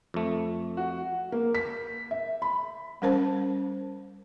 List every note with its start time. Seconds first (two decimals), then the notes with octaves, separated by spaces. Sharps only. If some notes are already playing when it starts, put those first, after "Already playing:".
0.14 F2 A3
0.77 F#4
1.32 A#3
1.55 B6
2.11 E5
2.42 B5
3.02 G3 C#4 A#4 C5 A5